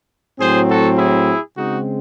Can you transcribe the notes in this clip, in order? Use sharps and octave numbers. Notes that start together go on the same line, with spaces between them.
A2 F#3 C4 G#4 C5
F#4 A4
E4 G#4
C#3 G#3 C4 D#4 F#4